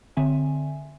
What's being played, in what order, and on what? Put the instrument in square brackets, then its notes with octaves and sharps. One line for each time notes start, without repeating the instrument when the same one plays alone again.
[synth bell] D3 C4 E5 G#5